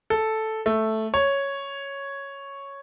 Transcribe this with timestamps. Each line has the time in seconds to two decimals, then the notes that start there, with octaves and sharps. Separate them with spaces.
0.10 A4
0.66 A3
1.14 C#5